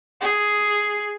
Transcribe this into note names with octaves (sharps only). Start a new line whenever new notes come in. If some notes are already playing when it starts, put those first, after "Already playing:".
G#4